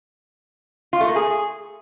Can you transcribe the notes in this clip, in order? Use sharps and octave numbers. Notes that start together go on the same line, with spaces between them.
F4
A3
A#3
G#4